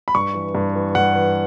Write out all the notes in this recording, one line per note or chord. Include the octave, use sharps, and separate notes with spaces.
B5
G2 C#6
E3
G2
E3
G2 F#5
E3